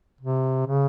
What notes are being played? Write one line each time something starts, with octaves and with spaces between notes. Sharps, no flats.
C3
C#3